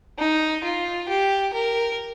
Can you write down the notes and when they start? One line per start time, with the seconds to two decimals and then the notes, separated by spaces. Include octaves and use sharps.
0.19 D#4
0.64 F4
1.09 G4
1.53 A#4